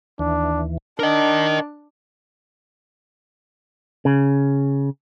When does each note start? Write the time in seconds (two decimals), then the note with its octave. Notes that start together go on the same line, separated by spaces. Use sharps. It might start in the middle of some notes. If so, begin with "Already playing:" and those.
0.19 D#2 E3 D4
0.99 D4 A#4 D#5
4.05 C#3